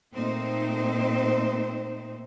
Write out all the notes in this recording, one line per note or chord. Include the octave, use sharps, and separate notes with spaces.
A#2 A3 C4 D#4 C5